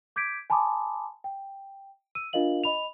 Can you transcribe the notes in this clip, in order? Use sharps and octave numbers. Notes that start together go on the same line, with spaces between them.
D6 G6 G#6 B6 D7
G#5 A5 B5 C6 D6 D#6
G5
E6 D#7
D4 F4 A#4 D#5 F5 F#7
D#5 B5 F7